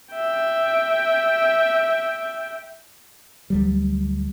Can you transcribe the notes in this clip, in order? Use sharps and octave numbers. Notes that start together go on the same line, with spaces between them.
E5 G5
D2 F#3 G3